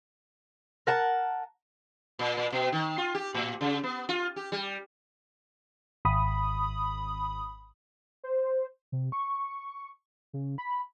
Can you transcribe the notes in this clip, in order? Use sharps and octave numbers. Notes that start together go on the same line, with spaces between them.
A#4 F#5 A5
A#2
A#2
B2
D#3
F4
G4
A2
C#3
B3
F4
G4
G3
G#1 B5 D#6
C5
C3
C#6
C#3
B5